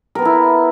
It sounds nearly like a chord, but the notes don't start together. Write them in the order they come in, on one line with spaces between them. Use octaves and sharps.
A#4 B3 A4 E4